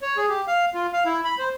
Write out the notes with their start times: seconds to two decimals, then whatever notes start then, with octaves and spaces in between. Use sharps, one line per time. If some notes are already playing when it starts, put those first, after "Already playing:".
0.02 C#5
0.17 G#4
0.29 G4
0.48 F5
0.75 F4
0.93 F5
1.05 E4
1.24 B5
1.39 C5